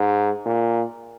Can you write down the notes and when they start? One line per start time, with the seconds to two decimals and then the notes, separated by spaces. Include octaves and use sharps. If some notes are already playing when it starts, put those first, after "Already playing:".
Already playing: G#2
0.46 A#2